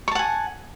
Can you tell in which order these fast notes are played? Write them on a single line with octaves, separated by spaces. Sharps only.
C#6 A5 F#5 G#5